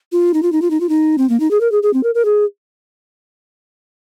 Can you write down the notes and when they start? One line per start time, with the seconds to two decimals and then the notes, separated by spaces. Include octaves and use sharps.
0.12 F4
0.34 D#4
0.43 F4
0.52 D#4
0.62 F4
0.71 D#4
0.80 F4
0.89 D#4
1.18 C4
1.29 A#3
1.40 D#4
1.51 G#4
1.61 A#4
1.72 G#4
1.83 G#4
1.93 C4
2.03 A#4
2.15 A#4
2.25 G#4